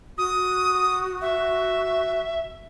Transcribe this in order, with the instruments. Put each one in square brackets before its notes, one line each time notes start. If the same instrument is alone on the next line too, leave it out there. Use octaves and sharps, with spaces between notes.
[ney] F#4 [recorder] D#6
[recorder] E5